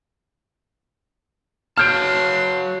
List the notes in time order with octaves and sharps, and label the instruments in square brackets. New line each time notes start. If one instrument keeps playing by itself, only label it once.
[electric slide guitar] F#4 C#5 A5 [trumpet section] B4 C6 [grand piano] F6 G6 D7